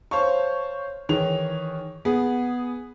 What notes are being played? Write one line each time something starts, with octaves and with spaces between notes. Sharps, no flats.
C5 C#5 F5 A5 C#6
D#3 E3 G#4 C#5 F7
B3 G#4